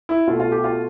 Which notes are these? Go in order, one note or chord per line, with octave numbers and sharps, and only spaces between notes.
E4
B2 A3 F4
F4
G4
F4